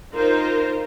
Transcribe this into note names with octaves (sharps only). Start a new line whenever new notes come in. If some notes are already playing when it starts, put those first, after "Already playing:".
D#4 F4 A#4 C5